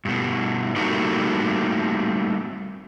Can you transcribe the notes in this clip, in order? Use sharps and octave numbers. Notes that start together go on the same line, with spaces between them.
G2 B2
G3 A3 A#3 C4 D#4 F#4